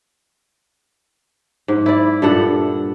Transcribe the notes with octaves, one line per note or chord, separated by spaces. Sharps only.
G#2
E4 D5
G2 A#2 A4 F#5